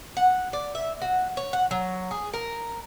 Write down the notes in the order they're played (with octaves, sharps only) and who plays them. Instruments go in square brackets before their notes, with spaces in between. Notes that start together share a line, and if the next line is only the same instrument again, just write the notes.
[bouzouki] F#5
D5
E5
F#4
C#5
F#5
F#3
G#4
A#4